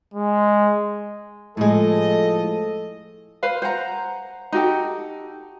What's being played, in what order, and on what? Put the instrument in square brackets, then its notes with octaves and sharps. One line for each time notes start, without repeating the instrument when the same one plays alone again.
[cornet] G#3
[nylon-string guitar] A2 G#3 [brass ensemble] F3 A4 D#5
[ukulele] B4 C5 F5
C5 F#5 A#5
D#4 F#4 G4 A4